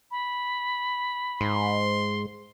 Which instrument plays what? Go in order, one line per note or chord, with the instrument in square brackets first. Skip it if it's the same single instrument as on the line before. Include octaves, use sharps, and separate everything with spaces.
[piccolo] B5
[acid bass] G#2 [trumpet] C6